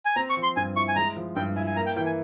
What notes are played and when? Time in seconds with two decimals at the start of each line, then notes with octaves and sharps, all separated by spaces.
0.05 G#5
0.16 C4 A#5
0.30 C#6
0.37 F3
0.43 C6
0.57 G2 G#5
0.76 E4 C#6
0.88 G#5
0.96 G#3 A#5
1.16 F3
1.36 G2 G5
1.56 E4 G#5
1.67 G#5
1.76 A#3 A#5
1.86 G5
1.96 E3 G5
2.06 G#5